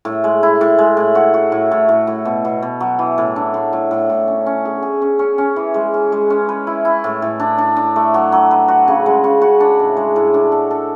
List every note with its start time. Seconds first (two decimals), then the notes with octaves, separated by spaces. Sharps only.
0.05 A2
0.24 G#3
0.43 E4
0.61 A2
0.78 G#3
0.97 A2
1.15 F#4
1.34 F#4
1.52 A2
1.71 A2
1.89 A2
2.07 A2
2.25 B2
2.45 B2
2.62 B2
2.80 F#3
2.99 E3
3.18 A2
3.36 D4
3.54 A2
3.73 A2
3.91 A2
4.10 A2
4.28 C#4
4.46 C#4
4.65 G#4
4.83 G#4
5.02 C#4
5.19 C#4
5.38 C#4
5.56 E3
5.74 G#3
5.94 C#4
6.12 G#3
6.30 C#4
6.49 B4
6.67 E4
6.85 E4
7.04 A2
7.22 A2
7.40 D4
7.58 D4
7.77 D4
7.96 A3
8.14 F#3
8.32 F#3
8.51 B4
8.68 F#4
8.88 C#3
9.06 G#3
9.24 C#3
9.42 F#4
9.60 D4
9.79 A2
9.97 G#3
10.16 A2
10.34 D4
10.52 A4
10.71 A4